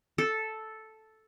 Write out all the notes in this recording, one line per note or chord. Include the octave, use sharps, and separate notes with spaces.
A4